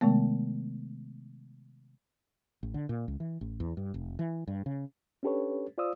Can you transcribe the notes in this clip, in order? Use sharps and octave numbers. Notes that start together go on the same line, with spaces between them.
C3 D#3 G#3 A3 B3
A1
D3
A#2
C#2
E3
A1
E2
G2
F1
E3
G2
C#3
C#4 D4 G4 A4 B4 C#5
F4 C5 D5 F5 D#6 E6